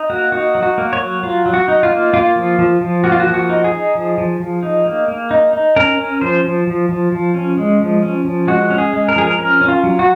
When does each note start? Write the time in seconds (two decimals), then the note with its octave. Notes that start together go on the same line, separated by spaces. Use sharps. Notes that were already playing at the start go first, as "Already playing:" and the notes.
Already playing: D#4
0.10 A#3 F#4
0.32 D#4 F#4
0.55 F#3
0.63 F#4
0.78 A#3
0.93 C#5
1.00 F#3
1.23 F#3 F4
1.46 F#3
1.54 F#4
1.68 D#4
1.83 F4
1.91 A#3
2.13 A#3 F4
2.36 F3
2.59 F3
2.81 F3
3.04 A#3 F#4
3.12 F4
3.20 F#4
3.27 F3
3.34 F#4
3.49 D#4
3.64 G#4
3.72 D#4
3.95 F3
4.18 F3
4.40 F3
4.63 D#4
4.86 A#3
5.08 A#3
5.31 D#4
5.53 D#4
5.76 C#4 A#4
5.98 C#4
6.21 F3 C5
6.44 F3
6.67 F3
6.89 F3
7.12 F3
7.34 C#4
7.57 G#3
7.80 F3
8.02 C#4
8.25 F3
8.48 G#3 F#4
8.70 C#4
8.78 G#4
8.93 G#3
9.09 A#4
9.16 F3 G#4
9.27 A#4
9.38 C#4 A#4
9.61 C#4
9.68 F4
9.84 F#3
9.99 F#4